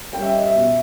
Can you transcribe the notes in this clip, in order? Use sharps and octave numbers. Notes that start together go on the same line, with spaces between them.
G3 C#4 G5
E5
D#5
E5
B2